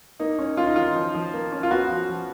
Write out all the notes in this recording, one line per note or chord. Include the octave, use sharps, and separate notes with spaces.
A#3 D#4
C#4
C#4 F4
D#4
D#3 F4
F3
F3
A#3
C#4
F4
B3 F#4
F3
F3